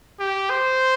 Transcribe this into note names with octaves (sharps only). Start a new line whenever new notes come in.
G4
C5